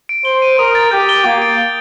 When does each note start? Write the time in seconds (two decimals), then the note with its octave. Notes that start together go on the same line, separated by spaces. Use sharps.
0.09 D7
0.25 C5 G7
0.42 D#7
0.59 A#4 D#6
0.75 A6
0.91 G4 G6
1.09 G7
1.24 A#3 G6
1.42 D7
1.58 G7